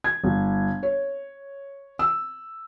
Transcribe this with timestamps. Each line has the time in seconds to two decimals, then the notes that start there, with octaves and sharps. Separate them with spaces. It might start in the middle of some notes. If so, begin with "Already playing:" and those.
0.04 G#6
0.24 G1
0.83 C#5
1.99 E6